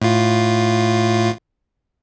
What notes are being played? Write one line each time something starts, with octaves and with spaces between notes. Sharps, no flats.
A2 F4